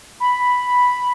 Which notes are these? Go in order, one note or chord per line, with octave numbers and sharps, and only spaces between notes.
B5